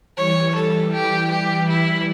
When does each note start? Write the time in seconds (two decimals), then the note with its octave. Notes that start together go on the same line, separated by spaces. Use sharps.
0.17 E3 G3 C#5
0.55 A4
0.93 G4
1.30 G4
1.68 E4